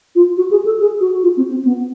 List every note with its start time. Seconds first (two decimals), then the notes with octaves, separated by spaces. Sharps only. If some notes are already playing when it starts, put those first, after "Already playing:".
0.15 F4
0.37 F#4
0.51 G#4
0.65 A4
0.80 G#4
1.00 F#4
1.23 F4
1.37 C4
1.50 C4
1.65 B3